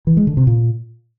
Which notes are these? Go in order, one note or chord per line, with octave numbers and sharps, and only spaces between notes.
E3
G#3
D3
C3
A#2